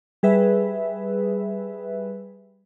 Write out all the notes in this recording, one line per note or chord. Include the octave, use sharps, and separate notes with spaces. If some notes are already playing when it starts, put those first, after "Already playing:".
G3 G#4 B4 E5